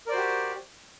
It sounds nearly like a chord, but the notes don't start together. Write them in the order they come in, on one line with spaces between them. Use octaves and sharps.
A#4 D5 C5 F#4 G4